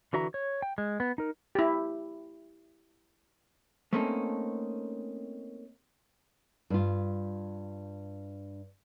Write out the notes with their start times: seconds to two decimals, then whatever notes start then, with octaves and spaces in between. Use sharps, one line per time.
0.13 D3 E3 F#4 E5 A#5
0.34 C#5
0.62 G5
0.78 G#3
1.00 B3
1.18 D#4 A#4
1.55 E4 G4
3.93 A3 A#3 C4 C#4 D#4 A4
6.70 G2 F4